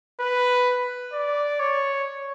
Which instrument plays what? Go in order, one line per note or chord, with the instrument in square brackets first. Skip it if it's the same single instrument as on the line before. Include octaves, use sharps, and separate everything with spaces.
[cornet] B4
D5
C#5